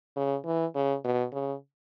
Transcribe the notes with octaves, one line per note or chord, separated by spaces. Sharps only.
C#3
E3
C#3
B2
C#3